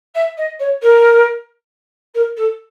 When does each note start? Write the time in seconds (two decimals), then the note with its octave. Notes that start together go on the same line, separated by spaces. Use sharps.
0.15 E5
0.37 D#5
0.59 C#5
0.82 A#4
2.14 A#4
2.37 A4